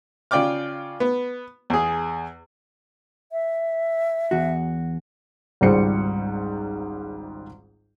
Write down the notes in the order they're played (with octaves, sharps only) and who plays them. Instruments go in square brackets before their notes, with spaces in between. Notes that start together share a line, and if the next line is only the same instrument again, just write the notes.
[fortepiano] C#3 F4 D5 G5 D6 F6
B3
E2 G#4
[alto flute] E5
[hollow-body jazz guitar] E2 F#4
[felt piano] G#1 C#2 G#2 G3 C5 C#7